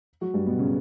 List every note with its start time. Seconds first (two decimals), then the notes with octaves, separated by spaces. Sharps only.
0.21 F#3 F#4
0.34 G2 G3
0.46 B2 B3
0.59 C#3 C#4